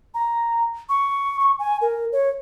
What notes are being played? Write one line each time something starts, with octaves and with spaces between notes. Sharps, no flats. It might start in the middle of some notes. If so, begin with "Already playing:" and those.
A#5
C#6
C#6
G#5
A#4
C#5